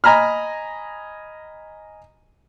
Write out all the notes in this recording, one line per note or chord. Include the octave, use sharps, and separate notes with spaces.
D#5 G#5 A#5 B5 F6